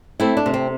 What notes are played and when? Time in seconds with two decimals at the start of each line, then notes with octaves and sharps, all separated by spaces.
0.20 A3 C4 E4
0.37 D4
0.46 C3
0.54 C4